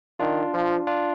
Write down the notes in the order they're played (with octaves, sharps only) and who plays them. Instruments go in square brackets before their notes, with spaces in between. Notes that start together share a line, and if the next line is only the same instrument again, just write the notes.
[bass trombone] D#3 [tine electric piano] D4 F4
[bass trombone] F3
[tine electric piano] D4 F4